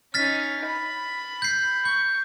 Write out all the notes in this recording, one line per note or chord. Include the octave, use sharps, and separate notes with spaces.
C#4 D#4 F6 A6 B6
B5
G6 C7
C#6 G6